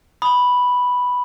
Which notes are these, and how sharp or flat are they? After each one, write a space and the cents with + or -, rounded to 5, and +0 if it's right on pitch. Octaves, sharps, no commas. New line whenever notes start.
B5 +0 D#6 -5